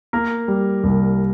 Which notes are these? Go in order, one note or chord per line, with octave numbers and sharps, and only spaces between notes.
A#3 A#4
G3
C2